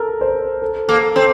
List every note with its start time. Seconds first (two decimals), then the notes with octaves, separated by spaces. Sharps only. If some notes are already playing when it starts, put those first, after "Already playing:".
Already playing: A4 A#4
0.21 C5
0.62 A4
0.88 A#3 A4
1.16 C4 A4